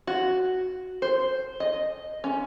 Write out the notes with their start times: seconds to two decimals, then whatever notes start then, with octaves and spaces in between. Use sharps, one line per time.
0.07 F#4
1.02 C5
1.60 D#5
2.24 C#4